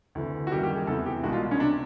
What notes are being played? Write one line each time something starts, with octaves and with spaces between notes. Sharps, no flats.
D2 C3 E3
F#4
F#2 D#3 G3 A#3 G4
G4
G#4
E2 C3 E3 A3 A4
G4
C2 B2 G#3 F#4
F4
C#4
C3 D4